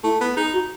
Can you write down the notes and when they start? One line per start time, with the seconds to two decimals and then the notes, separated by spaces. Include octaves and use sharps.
0.03 A3 E4
0.21 B3
0.36 D#4 G#4
0.53 F#4